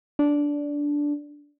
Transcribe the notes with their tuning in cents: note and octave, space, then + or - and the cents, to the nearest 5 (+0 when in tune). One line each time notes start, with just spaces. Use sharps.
D4 -10